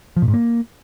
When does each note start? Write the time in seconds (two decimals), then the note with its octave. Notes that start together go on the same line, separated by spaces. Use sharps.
0.17 F3
0.22 A#2
0.28 G#2
0.34 A#3